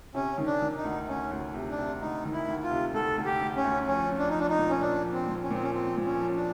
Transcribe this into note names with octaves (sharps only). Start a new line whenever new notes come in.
C3 C#4
D#3
D4
D#3
D#4
D2
D2 C#4
D2
C3
D4
C3
D2 D#4
D#3
E4
D2
F4
C3
D2 A4
D2
G4
D2
C#4
D2
F3 C#4
F3
D4
D#4
F3 D4
D#4
A#2
C#4
A#2 D4
F3
C4
A#2
C#4
A#2 C4
C#4
F3 C4
A#2
C#4
F3
D4